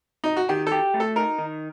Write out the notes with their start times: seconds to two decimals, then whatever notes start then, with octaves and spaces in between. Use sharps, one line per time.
0.24 D#4
0.37 F#4
0.49 D#3 G4
0.67 G4 A4
0.94 A3
1.00 A4
1.16 D#4 A#4
1.39 D#3